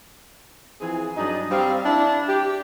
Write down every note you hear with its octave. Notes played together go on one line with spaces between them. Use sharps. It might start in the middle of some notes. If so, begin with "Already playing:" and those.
E3 F3 C4 G#4
G2 F#3 D4 D#4 D#5 A#5
G3 C4 F5
D4 E4
G4